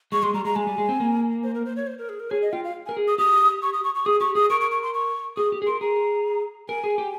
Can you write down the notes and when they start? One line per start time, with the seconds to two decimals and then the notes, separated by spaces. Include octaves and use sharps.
0.12 G#3 C#6
0.23 G#3 C6
0.34 G3 A#5
0.45 G#3 A#5
0.56 G#3 G#5
0.67 G3
0.78 G#3
0.89 C4
1.00 A#3
1.43 C5
1.55 A#4
1.65 C5
1.76 C#5
1.87 C5
1.98 A#4
2.09 G#4
2.20 A#4
2.30 G#4 C#5
2.42 D#5
2.53 F4 G5
2.64 F5
2.86 G#5
2.89 A#4
2.97 G#4
3.08 D#6
3.18 G4 D#6
3.63 C#6
3.74 D#6
3.84 C#6
3.95 C#6
4.06 G#4 D#6
4.20 G4 C#6
4.35 G#4 D#6
4.50 A#4 C#6
4.61 C#6
4.71 C#6
4.83 C6
4.94 C#6
5.37 G#4 D#6
5.52 G4
5.62 G#4
5.67 A#4 C6
5.81 G#4 A#5
6.69 A#4 G#5
6.84 G#4
6.98 G4